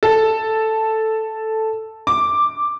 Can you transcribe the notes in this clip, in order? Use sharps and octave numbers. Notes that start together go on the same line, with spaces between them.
A4
D6